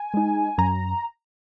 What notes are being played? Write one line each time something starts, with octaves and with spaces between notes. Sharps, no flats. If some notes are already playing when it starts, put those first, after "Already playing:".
Already playing: G#5
G#3 D#4
F#2 A#5